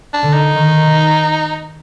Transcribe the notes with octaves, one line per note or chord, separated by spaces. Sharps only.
D4
D3
D#4
D#3